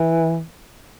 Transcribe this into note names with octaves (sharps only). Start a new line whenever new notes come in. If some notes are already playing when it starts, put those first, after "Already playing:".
Already playing: E3